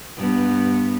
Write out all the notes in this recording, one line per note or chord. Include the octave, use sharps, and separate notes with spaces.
G2 B3